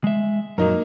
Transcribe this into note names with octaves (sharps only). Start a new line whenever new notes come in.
G#3 E5
F#2 A#2 F#3 A#3 D#4 A#4